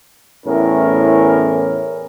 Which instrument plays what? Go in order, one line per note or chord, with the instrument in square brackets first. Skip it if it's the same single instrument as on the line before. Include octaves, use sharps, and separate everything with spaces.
[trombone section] E2 A2 C#4 A#4